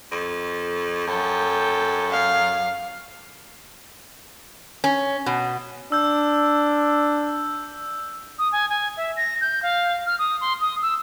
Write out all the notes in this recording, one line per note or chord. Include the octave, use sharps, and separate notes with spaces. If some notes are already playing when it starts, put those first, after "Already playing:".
F2
F#2 A4 G5
F5
C#4
B2
D4 E6 G6
D#6
G#5
G#5
E5
A#6
G6
F5
F6
D#6
C6
D#6
E6